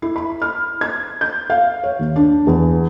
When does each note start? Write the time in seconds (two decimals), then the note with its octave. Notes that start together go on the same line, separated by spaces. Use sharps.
0.02 E4
0.16 B5
0.42 F6
0.81 G#6
1.21 G6
1.50 F5
1.83 C#5
1.99 D#2
2.16 D4
2.47 E2